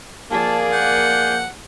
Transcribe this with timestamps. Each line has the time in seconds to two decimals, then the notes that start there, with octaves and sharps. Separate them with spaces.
0.31 F3 A#3 G#4 D5 A5
0.72 F#5 G6